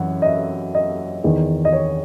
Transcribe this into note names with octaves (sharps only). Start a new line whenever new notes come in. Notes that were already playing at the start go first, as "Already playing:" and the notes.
Already playing: F#2 E3 F#5
D#5
E5
D#5
E2 D#3
D#5
C#5